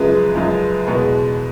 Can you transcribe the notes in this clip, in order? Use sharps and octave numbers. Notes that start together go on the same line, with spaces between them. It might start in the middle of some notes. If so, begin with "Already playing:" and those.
Already playing: F#2 C#3 F3 G#3 B4
F#2 C#3 F3 G#3
E2 B2 G#3 B4